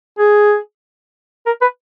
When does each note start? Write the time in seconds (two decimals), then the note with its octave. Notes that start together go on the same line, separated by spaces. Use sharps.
0.19 G#4
1.46 A#4
1.61 B4